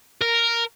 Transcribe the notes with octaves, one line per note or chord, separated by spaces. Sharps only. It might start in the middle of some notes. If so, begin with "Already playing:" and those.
A#4